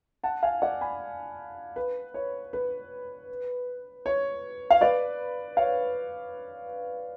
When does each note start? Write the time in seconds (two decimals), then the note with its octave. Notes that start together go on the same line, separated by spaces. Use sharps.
0.23 F#5 A5
0.42 F5 G#5
0.62 D5 F#5
0.81 G#5 B5
1.76 B4
2.14 C#5
2.53 B4
4.06 C#5
4.70 F5
4.81 B4 D5
5.57 C#5 F5